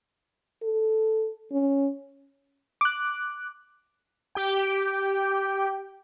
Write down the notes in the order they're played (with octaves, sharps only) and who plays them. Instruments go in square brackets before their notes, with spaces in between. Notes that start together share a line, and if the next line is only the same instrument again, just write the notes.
[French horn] A4
C#4
[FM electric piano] D6 F#6
[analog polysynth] G4 G5